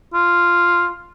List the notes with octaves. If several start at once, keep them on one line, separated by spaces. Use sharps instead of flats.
F4